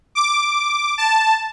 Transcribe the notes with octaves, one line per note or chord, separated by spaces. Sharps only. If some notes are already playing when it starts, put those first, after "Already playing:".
D6
A5